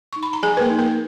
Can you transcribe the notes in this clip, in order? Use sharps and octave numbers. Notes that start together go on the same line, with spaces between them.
D#4 C#6
B5
A#5
F3 G#4 G#5
B4
A#3 A#4
D#4
A#3 A#4